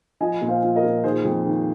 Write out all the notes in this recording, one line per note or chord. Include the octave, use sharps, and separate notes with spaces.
F3 D#5 G#5
A#2
C5 F5
F3
A#4 D#5
A#2
D#3 G#4 C5
F2
D#3